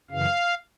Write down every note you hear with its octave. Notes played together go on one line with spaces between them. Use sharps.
F#2 C#3 E3 F5